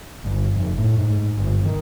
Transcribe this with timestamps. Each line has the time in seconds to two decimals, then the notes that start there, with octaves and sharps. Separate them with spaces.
0.24 G1
0.54 F1
0.78 A2
0.98 G#2
1.37 G1
1.65 D#3